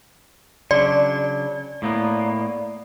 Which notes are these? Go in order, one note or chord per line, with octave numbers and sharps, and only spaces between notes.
C#3 F#3 D4 D5
A2 A#3 B3